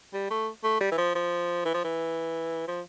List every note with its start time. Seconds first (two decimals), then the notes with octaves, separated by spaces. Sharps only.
0.14 G3
0.30 A3
0.64 A3
0.81 G3
0.92 E3
0.98 F3
1.15 F3
1.65 E3
1.74 F3
1.84 E3
2.68 F3